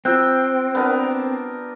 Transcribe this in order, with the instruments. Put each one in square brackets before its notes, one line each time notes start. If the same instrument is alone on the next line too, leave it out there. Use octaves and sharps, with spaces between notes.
[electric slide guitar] C4 [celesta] F4 E6 F#6 [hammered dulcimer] G5
[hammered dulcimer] B3 D4 A#4